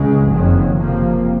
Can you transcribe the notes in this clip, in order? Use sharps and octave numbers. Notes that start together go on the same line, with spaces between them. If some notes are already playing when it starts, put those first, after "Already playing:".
Already playing: C#2 C#3 G#3
F#1 F2 D#3 F#3
F#1 F2 C3 F3 A#3